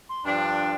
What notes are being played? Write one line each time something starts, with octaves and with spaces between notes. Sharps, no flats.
C6
G2 F3 D4 G5